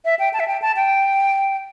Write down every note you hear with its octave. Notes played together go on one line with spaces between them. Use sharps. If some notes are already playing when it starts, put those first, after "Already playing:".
E5
G5
A5
E5
G5
A5
G5